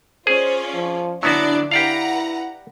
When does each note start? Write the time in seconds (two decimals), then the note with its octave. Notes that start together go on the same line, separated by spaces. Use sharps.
0.27 C#4 F4 G#4 C5 D5
0.74 F3
1.23 D3 F#3 B3 D4 E4 F#4 D5
1.71 E4 G4 B4 D5 F5 F#5 A#5